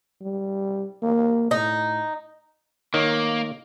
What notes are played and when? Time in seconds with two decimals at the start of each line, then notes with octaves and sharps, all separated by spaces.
0.21 G3
1.03 A#3
1.51 A2 D#4
2.94 D#3 A#3 C#5